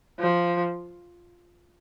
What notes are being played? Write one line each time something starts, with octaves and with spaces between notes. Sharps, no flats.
F3